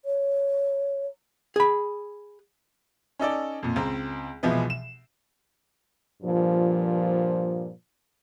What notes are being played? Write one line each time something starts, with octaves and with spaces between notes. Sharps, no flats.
C#5
G#4 B5
C#4 D#4 A4 D5
F2 A#2
C#2 C4 A#5
C2 B2 E3 F3 G#3 B3
E7
G2 A#2 F3